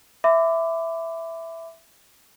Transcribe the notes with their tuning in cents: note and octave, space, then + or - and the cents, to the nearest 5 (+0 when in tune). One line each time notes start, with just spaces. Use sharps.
E5 +0 B5 +35 D6 +0